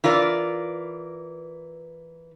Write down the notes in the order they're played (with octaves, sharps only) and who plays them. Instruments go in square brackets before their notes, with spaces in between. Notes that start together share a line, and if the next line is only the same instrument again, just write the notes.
[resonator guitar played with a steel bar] E3 F4 A#4 D5